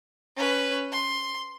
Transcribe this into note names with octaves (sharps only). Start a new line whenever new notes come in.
C#4 B4
C6